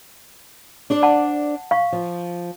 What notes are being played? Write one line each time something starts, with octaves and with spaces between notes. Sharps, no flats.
D4 C5 D5
F#5 A5
F5 C#6
F3